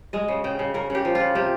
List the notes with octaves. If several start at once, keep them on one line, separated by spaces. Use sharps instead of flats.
G#3 D#5
C#3
C#3 G5
C#3
C#3 A#4
C#3 G4
F3
C#3 F4
C3 G4